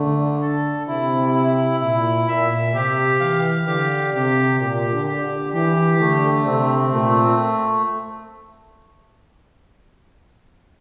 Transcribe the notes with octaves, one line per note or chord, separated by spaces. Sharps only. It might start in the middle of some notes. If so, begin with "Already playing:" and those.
Already playing: D3 A3
A4
C3 E4
E4
A#2 E4
A#2 E5
C3 G4
E3 F5
D3 G4
C3 G4
A#2 G4
D3
G4
D3
E3 G4
D3 A3
C3 C4
A#2 A3